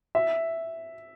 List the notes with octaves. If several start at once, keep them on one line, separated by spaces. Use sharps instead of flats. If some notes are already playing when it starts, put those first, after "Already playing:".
E5